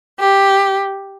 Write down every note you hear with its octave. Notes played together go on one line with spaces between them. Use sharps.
G4